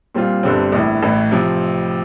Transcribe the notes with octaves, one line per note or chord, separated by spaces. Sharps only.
A#2 G3 C4 F4
G1 G2 D3 G3 C4
A#1 A2 E3
A1 A2 E3
C3 F3 C4